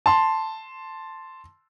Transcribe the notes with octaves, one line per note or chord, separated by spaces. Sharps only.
A5 C6